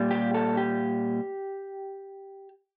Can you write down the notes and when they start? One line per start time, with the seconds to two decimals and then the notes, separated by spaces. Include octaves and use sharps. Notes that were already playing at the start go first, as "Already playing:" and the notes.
Already playing: A#2 G3
0.11 G4
0.34 A4
0.57 G4